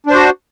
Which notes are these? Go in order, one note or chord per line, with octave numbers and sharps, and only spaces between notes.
D4 F#4 C5